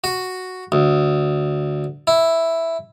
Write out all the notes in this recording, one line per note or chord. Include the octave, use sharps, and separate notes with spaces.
F#4
D2
E4